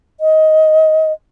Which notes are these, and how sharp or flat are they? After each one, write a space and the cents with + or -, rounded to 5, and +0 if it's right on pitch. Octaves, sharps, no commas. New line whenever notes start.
D#5 +15